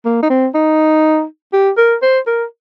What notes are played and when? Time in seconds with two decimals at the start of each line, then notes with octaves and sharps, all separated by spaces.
0.05 A#3
0.22 D#4
0.30 C4
0.55 D#4
1.53 G4
1.78 A#4
2.02 C5
2.27 A#4